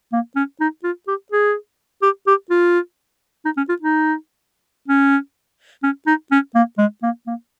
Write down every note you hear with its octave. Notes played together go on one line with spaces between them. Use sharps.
A#3
C#4
D#4
F4
G4
G#4
G4
G4
F4
D#4
C#4
F4
D#4
C#4
C#4
D#4
C#4
A#3
G#3
A#3
A#3